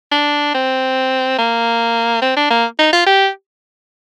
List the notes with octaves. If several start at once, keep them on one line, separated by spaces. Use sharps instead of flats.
D4
C4
A#3
C4
D4
A#3
D#4
F4
G4